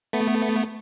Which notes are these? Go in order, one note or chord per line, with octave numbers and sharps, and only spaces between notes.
A3 B3